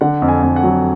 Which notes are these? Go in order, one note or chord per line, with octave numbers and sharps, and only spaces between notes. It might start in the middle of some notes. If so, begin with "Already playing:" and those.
D3 F#5
F2
G#5
F2
F#5
F#3